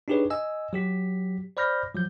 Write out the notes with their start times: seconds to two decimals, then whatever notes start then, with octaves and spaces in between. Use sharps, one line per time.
0.08 D4 D#4 G4 G#4 B4 C#5
0.30 D#5 G#5 E6
0.73 F#3 G4 B6
1.57 C5 D5 B5 F6 G6 A#6
1.95 F3 F#3 G6